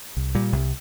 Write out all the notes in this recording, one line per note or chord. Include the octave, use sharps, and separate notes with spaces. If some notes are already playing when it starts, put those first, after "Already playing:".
C2
A#2 G3
C2